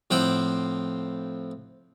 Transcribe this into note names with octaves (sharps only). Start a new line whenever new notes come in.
A2 F3 C4 F#5 G5